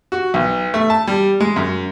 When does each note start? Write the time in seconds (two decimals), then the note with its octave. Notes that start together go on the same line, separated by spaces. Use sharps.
0.12 F#4
0.34 B1
0.74 A3
0.90 A5
1.07 G3
1.40 G#3
1.56 F#2